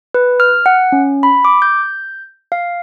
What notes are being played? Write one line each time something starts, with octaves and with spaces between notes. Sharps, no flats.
B4
F6
F#5
C#4
B5
D6
G6
F5